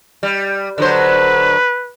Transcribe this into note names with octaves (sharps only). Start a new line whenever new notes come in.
G3
D3 F#3 B4 C5